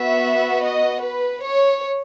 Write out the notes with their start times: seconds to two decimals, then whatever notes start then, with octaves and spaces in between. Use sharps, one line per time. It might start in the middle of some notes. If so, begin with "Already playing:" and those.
Already playing: B3 F#4 E5
0.62 D#5
1.01 B4
1.42 C#5